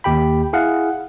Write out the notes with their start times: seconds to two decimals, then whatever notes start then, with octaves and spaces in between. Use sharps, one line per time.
0.04 D#2 G4 G5 B5
0.53 E4 G#4 F5 F#5